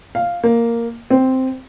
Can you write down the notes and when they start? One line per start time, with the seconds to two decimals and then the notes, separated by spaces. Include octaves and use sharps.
0.15 F5
0.44 A#3
1.10 C4